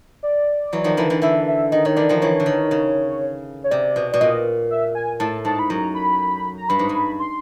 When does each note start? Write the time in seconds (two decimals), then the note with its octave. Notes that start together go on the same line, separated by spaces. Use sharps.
0.23 D5
0.73 E3 F#3
0.84 D#3 F3
0.97 D3 E3
1.10 D3 E3
1.22 D3 E3 E5
1.47 E5
1.72 D#3 D#5
1.85 D#3 C#5
1.97 D3 E3 D5
2.09 D#3 F3
2.21 D3 E3 C#5
2.40 D3
2.46 D#3
2.71 C#3
3.64 C#5
3.71 C3 D5
3.96 B2
4.12 B2 D5
4.21 A#2 D#5
4.71 E5
4.95 G#5
5.20 A2 A5
5.45 G#2 A5
5.59 B5
5.70 F#2 A#5
5.94 B5
6.58 A#5
6.69 G2 B5
6.79 G#2
6.89 G2
6.95 B5
7.19 C6